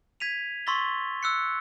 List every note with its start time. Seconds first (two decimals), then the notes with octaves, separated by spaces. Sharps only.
0.20 G#6 B6 D#7 F7
0.66 C6 C#6 E6 A6 B6 G7
1.23 E6 F#6 C#7